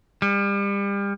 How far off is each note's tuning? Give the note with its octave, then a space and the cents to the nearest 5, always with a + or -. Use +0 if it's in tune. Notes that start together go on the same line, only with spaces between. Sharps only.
G3 +35